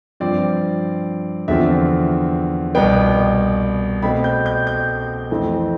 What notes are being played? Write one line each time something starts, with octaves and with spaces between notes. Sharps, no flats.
G2 F3 C4 D5
E2 D3 F3 C4 E5
C2 B2 B3 G5
B2 A3 C4 B5
G6
G6
G6
F2 E3 A3 C4